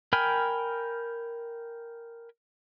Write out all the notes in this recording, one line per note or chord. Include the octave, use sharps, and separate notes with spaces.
A#4 G5 G#5 B5 F6